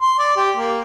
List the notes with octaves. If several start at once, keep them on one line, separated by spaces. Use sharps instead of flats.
C6
D5
G4
A#3